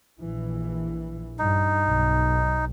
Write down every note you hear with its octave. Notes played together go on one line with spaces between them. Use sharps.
A#1 E3
G2 D#4
B1